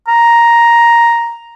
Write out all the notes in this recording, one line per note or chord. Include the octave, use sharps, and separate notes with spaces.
A#5